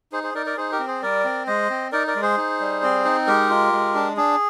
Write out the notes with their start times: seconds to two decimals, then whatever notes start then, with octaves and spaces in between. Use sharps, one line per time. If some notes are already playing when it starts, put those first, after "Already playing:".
0.12 D#4 G#4 C5
0.23 G#4 C5
0.34 D#4 A#4 D5
0.46 A#4 D5
0.57 D#4 G#4 C5
0.72 G4 A#4
0.79 C4
0.87 G#4 C5
1.02 G3 A#4 D5
1.24 C4
1.47 G#3 C5 D#5
1.70 C4
1.92 D#4 A#4 D5
2.07 A#4 D5
2.16 G#3
2.22 G#4 C5
2.37 D#4
2.60 G3
2.83 C4
3.05 D#4
3.27 G#3 G4 A#4
3.50 F4
3.73 G#3
3.95 D4
4.17 D4 G#4